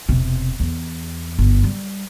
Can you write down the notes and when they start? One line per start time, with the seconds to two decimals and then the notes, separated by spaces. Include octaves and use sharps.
0.09 E1 C3
0.60 E2
1.39 G1
1.64 G3